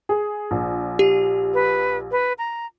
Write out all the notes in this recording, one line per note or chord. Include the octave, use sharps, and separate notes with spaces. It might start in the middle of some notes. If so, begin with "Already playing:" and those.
G#4
A#1
G4
B4
B4
A#5